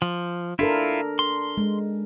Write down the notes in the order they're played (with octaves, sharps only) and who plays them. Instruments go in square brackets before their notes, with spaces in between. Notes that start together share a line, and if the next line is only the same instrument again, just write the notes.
[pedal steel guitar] F3
[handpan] D4 A4 A#4 [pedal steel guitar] E4 F4
[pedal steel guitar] C6
[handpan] G#3